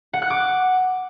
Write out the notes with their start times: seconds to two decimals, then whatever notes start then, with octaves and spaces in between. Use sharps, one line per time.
0.13 F#5
0.22 F#6
0.30 D6